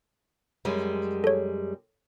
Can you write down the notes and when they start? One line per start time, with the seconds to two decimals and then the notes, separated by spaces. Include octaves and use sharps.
0.65 F#2 G3 G#3
1.24 A4 C#5